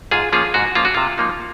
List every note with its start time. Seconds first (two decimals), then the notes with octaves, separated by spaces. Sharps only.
0.11 G#2 F4 G#4
0.32 F3 A#3 C#4 F4 G#4
0.54 G#2 F#4
0.75 F3 A#3 C#4 F4
0.85 F#4
0.94 C3 F4
1.18 F3 A#3 D#4